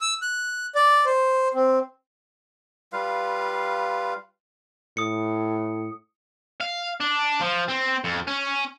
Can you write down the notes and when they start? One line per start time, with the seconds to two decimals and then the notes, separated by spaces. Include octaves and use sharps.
0.01 E6
0.22 F#6
0.75 D5
1.06 C5
1.54 C4
2.93 G3 F4 B4 F5
4.97 A2 D#6 C#7
6.60 F5
7.00 D4
7.41 F3
7.69 C4
8.04 F2
8.28 C#4